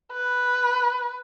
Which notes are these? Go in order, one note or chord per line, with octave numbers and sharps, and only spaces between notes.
B4